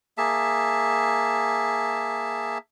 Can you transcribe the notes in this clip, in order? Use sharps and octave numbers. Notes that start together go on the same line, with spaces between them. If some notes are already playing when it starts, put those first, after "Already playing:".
A#3 G#4 E5 A5